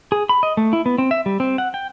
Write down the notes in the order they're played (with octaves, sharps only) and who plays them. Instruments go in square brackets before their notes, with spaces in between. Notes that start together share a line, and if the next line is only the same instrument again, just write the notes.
[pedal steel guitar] G#4
B5
D#5
A3
E4
B3
C4
E5
G3
C4
F#5
G5